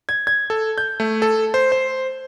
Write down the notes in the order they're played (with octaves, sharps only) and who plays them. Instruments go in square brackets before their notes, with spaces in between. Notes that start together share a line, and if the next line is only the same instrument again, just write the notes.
[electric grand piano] G#6
G#6
A4
G6
A3
A4
C5
C5